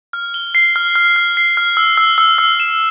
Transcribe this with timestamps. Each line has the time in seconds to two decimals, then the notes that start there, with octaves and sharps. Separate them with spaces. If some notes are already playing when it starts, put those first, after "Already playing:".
0.13 F6
0.34 G7
0.55 C7
0.76 F6
0.95 F6
1.16 F6
1.37 C7
1.57 F6
1.77 E6
1.97 E6
2.18 E6
2.38 E6
2.60 E7